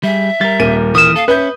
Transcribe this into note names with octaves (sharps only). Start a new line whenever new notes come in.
G3 G#4 E5
G3 A#4 A6
D#1 A#3 D#7
E3 A#4 D#6 E7
A4 F5
C#4 B4 E5 G6